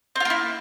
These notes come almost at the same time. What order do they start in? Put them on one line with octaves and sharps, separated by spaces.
C4 F4 A#3 E4